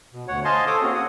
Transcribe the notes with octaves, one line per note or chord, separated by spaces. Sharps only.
B2
D2 C#5 F#5
C5 D#5 F5 G#5 A5 C6
A4 C5 C#5 D6 D#6
A#3 C4 C#4 F#4 G#4
F#5 D#6